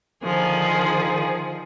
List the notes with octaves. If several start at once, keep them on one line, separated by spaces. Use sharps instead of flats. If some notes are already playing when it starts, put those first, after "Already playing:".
D3 D#3 F3 G#4